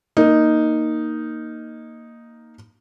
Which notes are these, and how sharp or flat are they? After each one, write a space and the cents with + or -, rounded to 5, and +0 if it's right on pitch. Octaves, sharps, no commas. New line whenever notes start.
A#3 +0 D#4 +0